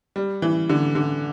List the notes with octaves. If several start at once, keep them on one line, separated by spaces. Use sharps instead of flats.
G3
E3
D3
D3